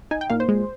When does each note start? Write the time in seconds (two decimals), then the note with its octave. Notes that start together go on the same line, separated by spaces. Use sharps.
0.11 D#4 G#5
0.21 G5
0.30 A#2 F5
0.40 C5
0.49 G#3